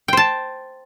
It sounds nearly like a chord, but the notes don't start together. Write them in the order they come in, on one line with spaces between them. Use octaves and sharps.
G5 C5 A5